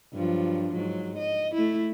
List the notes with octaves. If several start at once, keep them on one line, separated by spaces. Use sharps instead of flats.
G2 F3 F#3
G#2 F#3
D#5
A3 E4